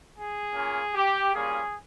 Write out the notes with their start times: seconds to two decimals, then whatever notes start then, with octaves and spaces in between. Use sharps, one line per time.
0.15 G#4
0.54 A#3 C#4 F4
0.95 G4
1.34 G3 A#3 C#4 F4 G#4